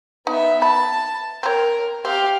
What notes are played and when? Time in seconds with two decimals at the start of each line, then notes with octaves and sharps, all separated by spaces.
0.27 B3 D#4 E5
0.62 A5 B5
1.43 C4 A#4 C#5
2.05 C4 G4 F5